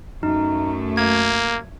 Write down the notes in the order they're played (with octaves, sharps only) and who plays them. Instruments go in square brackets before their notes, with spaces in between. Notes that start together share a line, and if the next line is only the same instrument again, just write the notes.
[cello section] F#2 A3 [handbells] D#4
[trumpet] A#3 [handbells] G#6